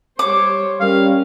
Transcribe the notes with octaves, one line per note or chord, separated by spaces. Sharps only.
G3 C5 C#5 D6
G3 C#4 A#4 F5